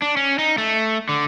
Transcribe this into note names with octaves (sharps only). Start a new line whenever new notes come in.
D4
C#4
D#4
A3
D3